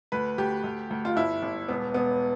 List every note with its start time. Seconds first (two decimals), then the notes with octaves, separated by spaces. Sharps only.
0.12 D2 B4
0.38 D2 G4
0.64 D2
0.90 D2
1.05 F4
1.16 G1 E4
1.43 G1
1.68 E1 B3
1.94 E1 B3